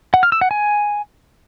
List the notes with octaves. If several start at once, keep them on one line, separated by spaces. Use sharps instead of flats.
F#5
F6
E6
F#5
G#5